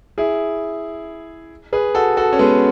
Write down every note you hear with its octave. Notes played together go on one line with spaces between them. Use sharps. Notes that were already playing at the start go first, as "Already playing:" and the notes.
E4 G#4
G#4 B4
F#4 A4
F#4 A4
C#4
G#3 B3